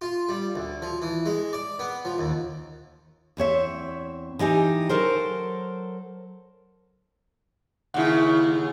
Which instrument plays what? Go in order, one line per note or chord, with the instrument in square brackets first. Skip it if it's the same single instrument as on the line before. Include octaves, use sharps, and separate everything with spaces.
[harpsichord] F4
G3
D2
F3
E3
G#3
D5
B3
F3
D#2
[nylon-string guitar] E2 C4 C#5 E5
E3 D#4 G4 G#5
F#3 A4 A#4 C5
[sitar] D#2 C#3 [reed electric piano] E4 F#5